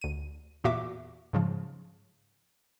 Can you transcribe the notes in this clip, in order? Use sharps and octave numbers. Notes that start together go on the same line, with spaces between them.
D2 D#7
E2 A#2 F#4 E5 D6
G#2 C#3 F3